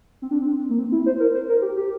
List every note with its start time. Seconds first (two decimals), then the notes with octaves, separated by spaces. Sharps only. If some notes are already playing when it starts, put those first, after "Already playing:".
0.22 C4
0.31 D4
0.41 C4
0.69 A#3
0.79 C4
0.92 E4
1.06 C5
1.20 A#4
1.34 C5
1.49 A#4
1.62 G4
1.77 G4